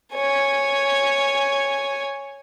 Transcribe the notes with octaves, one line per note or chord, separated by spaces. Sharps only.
C#5 G#5